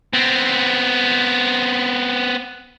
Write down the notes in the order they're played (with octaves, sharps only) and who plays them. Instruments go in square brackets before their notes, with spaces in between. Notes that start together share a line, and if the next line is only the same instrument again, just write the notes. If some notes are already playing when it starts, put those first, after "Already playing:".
[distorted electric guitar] B3 C4